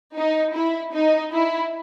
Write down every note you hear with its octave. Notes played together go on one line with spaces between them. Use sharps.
D#4
E4
D#4
E4